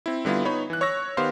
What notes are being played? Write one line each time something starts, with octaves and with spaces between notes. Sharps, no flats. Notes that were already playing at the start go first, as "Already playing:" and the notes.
C4 E4
D3 G3 B3 E4 F4
B3 D#4 C#5 B5
E3 F#6
C#5 C#6 E6 A#6
D#3 B3 G4 C5 F5 C6